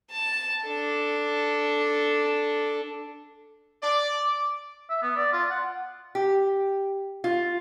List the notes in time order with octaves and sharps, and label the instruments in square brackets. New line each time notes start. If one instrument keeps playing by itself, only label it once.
[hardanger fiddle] A5
D4 A4
[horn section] D5 [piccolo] D6
[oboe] E5
B3
D5
F4
F#5
[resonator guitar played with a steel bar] G4
F4